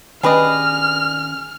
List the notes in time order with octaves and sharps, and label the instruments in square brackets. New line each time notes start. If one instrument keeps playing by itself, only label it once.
[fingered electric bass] D#3 C#4 [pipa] D4 G4 B4 [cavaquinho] G#4 D#5 [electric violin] F6